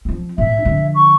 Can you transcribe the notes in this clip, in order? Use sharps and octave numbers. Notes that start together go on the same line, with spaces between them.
F3 C4
A2 E5
D3 F3
C#6